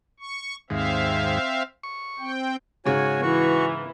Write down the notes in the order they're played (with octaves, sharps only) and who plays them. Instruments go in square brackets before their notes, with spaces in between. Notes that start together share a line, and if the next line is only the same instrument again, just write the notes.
[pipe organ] C#6
[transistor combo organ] D#2 G#2 [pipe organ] C4 E5 F5
[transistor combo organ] C#6
[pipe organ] C4 G5
[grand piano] G#2 C#3 [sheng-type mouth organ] F#4 C#5 G#5
[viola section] E3 [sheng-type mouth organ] F#4 C#6